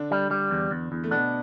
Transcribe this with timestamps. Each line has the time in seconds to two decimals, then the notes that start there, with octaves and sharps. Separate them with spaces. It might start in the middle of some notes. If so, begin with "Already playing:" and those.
Already playing: D3 D4
0.11 G3
0.31 G3
0.51 E2
0.71 E2
0.92 E2
1.04 A3
1.11 B2 B3 D4